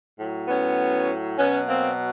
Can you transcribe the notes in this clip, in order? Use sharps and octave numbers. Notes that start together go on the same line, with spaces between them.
A2 F#3
B3 C#4
B2 F#3 B3 C#4
A#3 C4